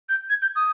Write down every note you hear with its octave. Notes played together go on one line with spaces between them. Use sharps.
G6
G#6
G6
D#6